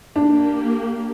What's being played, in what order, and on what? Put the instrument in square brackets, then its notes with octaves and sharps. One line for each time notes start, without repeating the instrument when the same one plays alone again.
[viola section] A#3 G4 [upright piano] D4